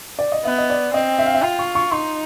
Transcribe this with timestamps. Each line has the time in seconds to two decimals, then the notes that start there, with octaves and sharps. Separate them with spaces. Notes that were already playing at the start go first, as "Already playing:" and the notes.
0.19 D5
0.32 D#5
0.45 B3 E5
0.58 D#5
0.70 D5
0.94 C4 D#5
1.19 E5
1.26 F5
1.34 E5
1.42 F4 G5
1.59 C#6
1.75 C#6
1.92 D#4 C6